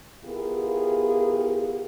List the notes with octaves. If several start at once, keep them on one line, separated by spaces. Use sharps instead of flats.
B3 E4 F4 G4 G#4 A#4